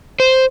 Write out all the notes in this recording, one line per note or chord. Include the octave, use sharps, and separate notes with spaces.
C5